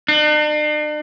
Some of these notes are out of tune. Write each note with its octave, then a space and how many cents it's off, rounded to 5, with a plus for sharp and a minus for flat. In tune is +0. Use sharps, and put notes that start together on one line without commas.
D4 +45